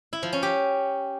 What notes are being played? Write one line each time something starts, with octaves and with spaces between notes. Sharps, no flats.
E4
F3
C#4
G4